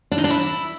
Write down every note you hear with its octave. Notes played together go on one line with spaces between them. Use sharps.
D4
D#4
D4
E4